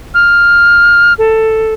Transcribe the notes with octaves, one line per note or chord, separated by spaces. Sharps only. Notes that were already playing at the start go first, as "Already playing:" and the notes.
F6
A4